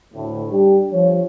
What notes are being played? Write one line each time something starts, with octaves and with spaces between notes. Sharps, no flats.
D2 A2
G3 D4 G4
F3 C#5